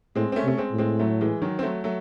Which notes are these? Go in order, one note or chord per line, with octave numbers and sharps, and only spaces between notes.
A2 G#3 C4
C4
A3 C#4
C3
A3
G#3 C4
A2
G#3 C4
F#3 A3
E3 G#3
D#3 F#3
C4
F#3 A3
F#3 A3